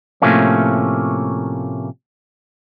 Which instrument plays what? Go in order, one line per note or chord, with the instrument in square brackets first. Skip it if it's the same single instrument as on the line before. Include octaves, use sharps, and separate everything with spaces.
[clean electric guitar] A2 C3 F3 A3 A#3 C#4